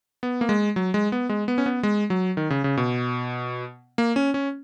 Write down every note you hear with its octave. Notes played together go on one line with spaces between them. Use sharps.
B3
A#3
G#3
F#3
G#3
B3
G#3
B3
C#4
B3
G#3
F#3
D#3
C#3
C#3
B2
A#3
C#4
C#4